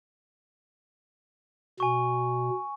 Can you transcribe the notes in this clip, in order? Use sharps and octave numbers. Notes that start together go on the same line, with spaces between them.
B2 G#5 C#6